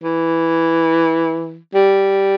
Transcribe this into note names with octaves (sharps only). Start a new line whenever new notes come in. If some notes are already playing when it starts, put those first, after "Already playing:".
E3
G3